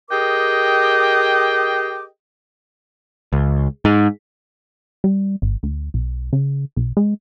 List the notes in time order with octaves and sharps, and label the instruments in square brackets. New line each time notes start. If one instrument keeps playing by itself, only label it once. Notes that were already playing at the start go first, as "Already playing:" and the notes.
[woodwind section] G4 G#4 A#4 D#5 G5 D6
[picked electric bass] C#2
G#2
[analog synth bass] G3
G#1
D2
B1
C#3
B1
G#3